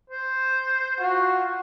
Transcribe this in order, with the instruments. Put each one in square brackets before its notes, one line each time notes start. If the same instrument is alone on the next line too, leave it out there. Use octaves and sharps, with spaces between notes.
[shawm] C5
[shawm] F4 [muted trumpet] F#4